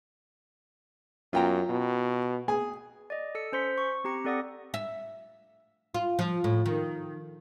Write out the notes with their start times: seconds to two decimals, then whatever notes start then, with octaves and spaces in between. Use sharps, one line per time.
1.33 F#2 F4 G5 A#5
1.69 B2
2.48 G#4 G#5
3.10 D5 D#5
3.35 A4 E6 C#7
3.52 C#4 C5 C6 B6
3.78 C#6
4.04 C4 G4 A#5 C#7
4.25 C4 A4 D5 F#5 D#6 A#6
4.74 E5
5.94 F4
6.19 F3
6.44 A2
6.66 D#3